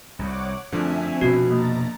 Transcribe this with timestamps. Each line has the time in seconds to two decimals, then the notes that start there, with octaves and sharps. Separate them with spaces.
0.19 C2 C3 C#5 F#5 D6
0.72 F#2 D3 F3 A3 C4 E5 G#5
1.21 F1 B2 B3 F#4
1.50 A#3 A#5 A6